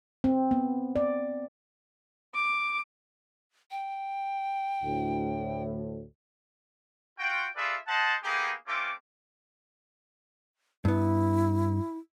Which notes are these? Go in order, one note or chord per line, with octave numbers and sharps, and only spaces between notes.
C4
B3
D5
D6
G5
D2 A2
F4 F#4 G5
F4 G#4 A4 B4 D5 E5
C5 D#5 F#5 A5
A#3 B3 D#4 G4 G#4
A3 C4 C#4 F4 D6
G2 B3 E4